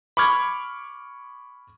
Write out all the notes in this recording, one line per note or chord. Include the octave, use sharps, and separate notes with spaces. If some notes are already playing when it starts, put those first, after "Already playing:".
B5 C#6 D6 F6 G#6